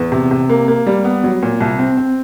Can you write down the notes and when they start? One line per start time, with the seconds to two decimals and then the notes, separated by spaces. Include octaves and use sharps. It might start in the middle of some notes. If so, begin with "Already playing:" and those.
Already playing: E2
0.12 C3
0.31 C3
0.50 A#3
0.68 A#3
0.87 G3
1.04 B3
1.24 F#3
1.43 A#2
1.60 C2
1.79 C4
1.97 C4